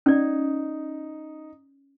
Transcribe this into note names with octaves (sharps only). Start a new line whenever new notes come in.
C#4 D#4 D5